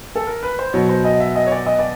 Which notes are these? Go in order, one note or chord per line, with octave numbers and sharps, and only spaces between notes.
A4
A#4
B4
C5
B2 F#3 B3 C#5
C5
D#5
E5
D#5
C#5
D5
D#5
D5